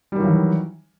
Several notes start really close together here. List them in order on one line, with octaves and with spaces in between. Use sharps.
G3 D#3 F#3 E3